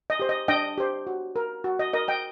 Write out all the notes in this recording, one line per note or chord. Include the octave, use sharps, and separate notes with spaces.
D#5
G4 C5
D#5
D4 D#5 G5
G4 C5
F#4
A#4
F#4
D#5
A#4 D#5
D#5 G5